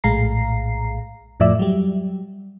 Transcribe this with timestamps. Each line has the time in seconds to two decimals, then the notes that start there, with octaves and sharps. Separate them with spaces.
0.04 A#1 A2 G#3 F5 A#5 C7
1.40 F2 A2 F3 D5 E5 D6
1.59 F#3 G3